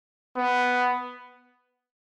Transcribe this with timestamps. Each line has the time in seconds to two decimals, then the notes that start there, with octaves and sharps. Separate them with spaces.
0.37 B3